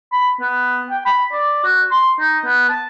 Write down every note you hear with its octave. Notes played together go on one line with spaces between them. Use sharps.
B5
B3
G5
B5
D5
F#4
C6
D#4
B3
A5